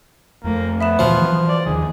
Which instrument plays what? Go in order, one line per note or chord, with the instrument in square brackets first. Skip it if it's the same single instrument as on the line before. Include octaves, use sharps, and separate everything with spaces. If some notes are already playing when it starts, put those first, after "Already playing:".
[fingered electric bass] F2 A3 [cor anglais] A#3
[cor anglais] B3 [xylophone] E5 B5 E7
[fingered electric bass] D2 A#2 E3 [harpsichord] F3
[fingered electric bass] E3 F#3
[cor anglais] D5
[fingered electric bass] D#2 D#3 F3 [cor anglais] G#4